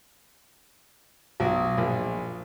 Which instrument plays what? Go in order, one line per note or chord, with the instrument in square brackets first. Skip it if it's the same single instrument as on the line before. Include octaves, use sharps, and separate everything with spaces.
[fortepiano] B1
A#1